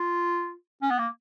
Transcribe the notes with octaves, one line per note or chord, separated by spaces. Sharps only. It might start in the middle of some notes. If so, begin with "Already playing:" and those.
Already playing: F4
C#4
B3
A#3